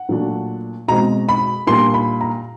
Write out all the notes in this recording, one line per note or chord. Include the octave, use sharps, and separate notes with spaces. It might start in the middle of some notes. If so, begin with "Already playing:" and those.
Already playing: F#5
A#2 F#3 A3 D4
B2 G#3 C4 A#5
B5
A#2 G3 A#3 D4 C6
B5
A#5